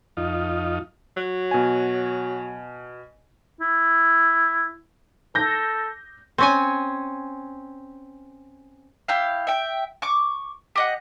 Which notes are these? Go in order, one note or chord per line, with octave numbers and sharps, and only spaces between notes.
F2 D#4 F4
F#3
B2 G#5
E4
A4 G6 A#6
C4 C#4 G#5
E4 G4 F5
E5 G5
C#6 D6
G4 D#5 F#5